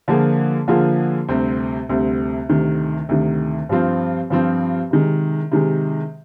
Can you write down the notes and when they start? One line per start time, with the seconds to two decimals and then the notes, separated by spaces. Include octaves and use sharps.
0.08 D3 F3 A#3 F4 G#4
0.68 D3 F3 A#3 F4 G#4
1.28 D2 C3 G3 C4
1.89 D2 C3 G3 C4
2.49 D2 C3 D#3
3.09 D2 C3 D#3
3.69 G2 F3 C4 F4
4.30 G2 F3 C4 F4
4.91 C3 D#3 G#3
5.52 C3 D#3 G#3